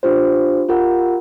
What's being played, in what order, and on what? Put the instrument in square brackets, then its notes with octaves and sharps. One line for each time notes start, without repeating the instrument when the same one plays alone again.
[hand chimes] D4 F4 G4 C5
F4 G4 A#4 F#5